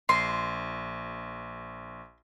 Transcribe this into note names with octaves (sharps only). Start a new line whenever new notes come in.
A#1 C6